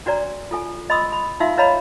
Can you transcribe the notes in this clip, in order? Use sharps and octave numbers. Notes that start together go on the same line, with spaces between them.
D4 F#4 B4 D5 A#5
F4 A4 G#5
D#5 B5 C6 D#6 E6
B5
D#4 F4 E5 F5 C6 E6
B4 C#5 D#5 F5 A#5 B5